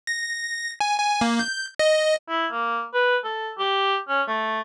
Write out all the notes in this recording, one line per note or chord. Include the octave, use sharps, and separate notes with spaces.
A#6
G#5
G#5
A#3
G6
D#5
E4
A#3
B4
A4
G4
C#4
A3